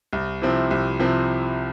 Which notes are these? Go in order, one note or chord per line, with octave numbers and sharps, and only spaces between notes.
C2
C3 F3 C4 E4
C2
C3 F3 C4 E4